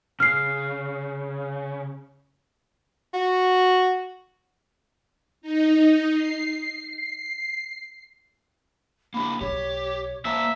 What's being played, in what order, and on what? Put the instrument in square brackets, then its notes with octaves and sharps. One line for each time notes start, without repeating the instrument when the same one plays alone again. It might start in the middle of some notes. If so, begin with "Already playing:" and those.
[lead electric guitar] C#3 [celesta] F6 C7
[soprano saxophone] F#4
[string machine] D#4
C7
[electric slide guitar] A#3 D4 G4 [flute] B5
[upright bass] B1 [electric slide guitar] G4 [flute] C#5
[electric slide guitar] A#3 C5 A5 [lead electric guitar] E5 [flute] A#5